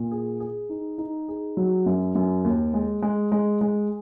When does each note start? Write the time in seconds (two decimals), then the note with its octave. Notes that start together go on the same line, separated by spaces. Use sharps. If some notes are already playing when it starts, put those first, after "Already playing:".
Already playing: A#2
0.11 G#4
0.40 G#4
0.69 D#4
0.98 D#4
1.28 G#4
1.57 F#3
1.86 F#2
2.15 F#2
2.45 D#2
2.74 G#3
3.02 G#3
3.32 G#3
3.61 G#3